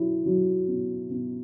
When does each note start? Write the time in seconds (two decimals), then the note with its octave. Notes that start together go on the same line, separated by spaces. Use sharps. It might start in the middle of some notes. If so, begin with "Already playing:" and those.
Already playing: F#3 E4
0.26 F#3
0.68 B3
1.10 B3